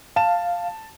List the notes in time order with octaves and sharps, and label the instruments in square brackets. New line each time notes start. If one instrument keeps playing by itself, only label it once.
[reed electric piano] F5 [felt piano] A5 E7